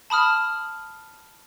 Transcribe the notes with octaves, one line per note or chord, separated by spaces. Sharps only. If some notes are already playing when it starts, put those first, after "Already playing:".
A5 B5 D#6 F6